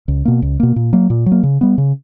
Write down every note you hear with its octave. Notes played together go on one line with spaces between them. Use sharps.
C#2
B2 A#3
C#2
B2 A#3
A#2
F#3 A#3
A#2
F#3
A#3
C#3
G3 B3
C#3